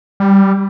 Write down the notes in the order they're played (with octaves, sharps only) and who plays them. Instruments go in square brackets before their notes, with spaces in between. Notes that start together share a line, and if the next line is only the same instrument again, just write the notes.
[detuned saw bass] G3